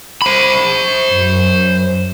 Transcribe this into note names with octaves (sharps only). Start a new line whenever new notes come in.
C5 B5
F#2